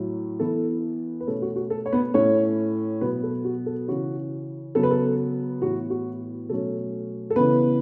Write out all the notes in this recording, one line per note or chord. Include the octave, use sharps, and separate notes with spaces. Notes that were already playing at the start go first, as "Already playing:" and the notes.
Already playing: A2 F#3
E3 B3 A4
B4
B2 A3 C#4 A4
F#4
F#4
A4
C#5
B3 B4
A2 A3 C#4 C#5
B2 F#3 B3 B4
A4
F#4
A4
C#3 E3 C#4 F#4
C#3 F#3 B3 A4
B4
A4
A2 E3 B3 F#4
F#4
B2 F#3 A3 C#4 A4
A4
C#3 E3 B3 B4